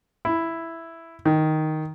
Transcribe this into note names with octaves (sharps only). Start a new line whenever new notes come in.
E4
D#3